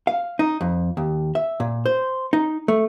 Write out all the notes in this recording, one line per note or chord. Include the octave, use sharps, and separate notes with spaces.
F5
D#4
F2
D#2
E5
A#2
C5
D#4
A3